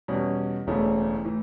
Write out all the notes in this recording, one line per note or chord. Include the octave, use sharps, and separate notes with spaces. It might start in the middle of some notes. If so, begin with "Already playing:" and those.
E2 B2 G3 C#4
E1 D2 C#3 E3 A3
A2 E3